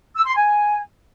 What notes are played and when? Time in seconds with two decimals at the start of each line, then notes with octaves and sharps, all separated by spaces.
0.16 E6
0.25 C6
0.34 G#5